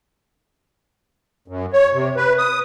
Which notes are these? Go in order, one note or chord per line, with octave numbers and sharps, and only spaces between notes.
F#2
C#5
C3
B4
D#6